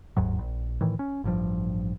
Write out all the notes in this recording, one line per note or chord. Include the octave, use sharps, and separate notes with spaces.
F#1 D#2 G#2 F#3
A#1
A2 D#3 E3
C#4
A1 G2 F3